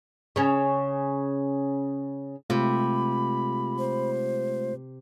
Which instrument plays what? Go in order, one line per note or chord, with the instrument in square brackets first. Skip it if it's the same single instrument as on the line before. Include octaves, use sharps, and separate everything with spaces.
[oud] C#3 C#4
[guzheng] C3 [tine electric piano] G#3 A3 F4 [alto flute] B5
[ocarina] C5